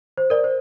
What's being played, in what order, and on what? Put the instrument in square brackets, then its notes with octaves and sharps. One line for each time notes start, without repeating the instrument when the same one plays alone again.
[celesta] C5
A#4 D5
C5